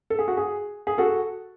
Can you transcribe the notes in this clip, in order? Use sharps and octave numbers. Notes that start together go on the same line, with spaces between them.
A4
G#4
F#4
G#4
G#4
F#4 A4